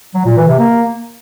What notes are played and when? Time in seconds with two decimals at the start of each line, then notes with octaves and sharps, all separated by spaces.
0.14 F#3
0.25 A#2
0.37 E3
0.48 C3
0.59 A#3